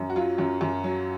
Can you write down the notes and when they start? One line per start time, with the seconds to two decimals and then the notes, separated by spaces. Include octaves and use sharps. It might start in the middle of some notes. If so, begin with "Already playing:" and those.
Already playing: F#2
0.10 F#4
0.16 F#3 F4
0.38 F#2
0.61 F#2
0.84 F#3